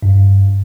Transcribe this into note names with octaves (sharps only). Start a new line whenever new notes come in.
G2